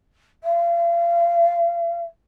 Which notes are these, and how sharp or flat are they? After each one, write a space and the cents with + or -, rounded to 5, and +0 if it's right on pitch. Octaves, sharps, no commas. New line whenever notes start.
F5 -40